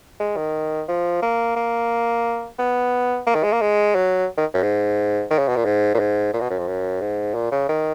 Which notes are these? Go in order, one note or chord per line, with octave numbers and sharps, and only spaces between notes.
G#3
D#3
F3
A#3
A#3
B3
A#3
D#3
G#3
A#3
G#3
F#3
D#3
F#2
G#2
D#3
C#3
B2
A#2
G#2
A#2
G#2
A#2
B2
F#2
F2
F#2
G#2
A#2
C#3
D#3